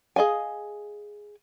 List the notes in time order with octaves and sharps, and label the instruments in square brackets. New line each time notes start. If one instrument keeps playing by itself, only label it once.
[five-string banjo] G#4 D#5 F5 G#5